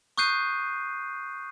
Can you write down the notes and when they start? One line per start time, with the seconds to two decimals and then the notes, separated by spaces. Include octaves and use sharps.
0.18 C#6 D#6 F#6 G6 C7 D#7